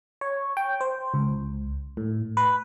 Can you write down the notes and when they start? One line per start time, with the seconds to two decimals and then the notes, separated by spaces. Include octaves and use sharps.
0.21 C#5
0.57 G5
0.81 C5
1.14 C#2
1.97 A2
2.37 B4